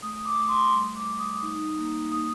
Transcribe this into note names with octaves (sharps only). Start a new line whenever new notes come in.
A3 D#6
D6
A3
C6
G3
D6
G3
D#6
D#4
A#3
A#3 D#6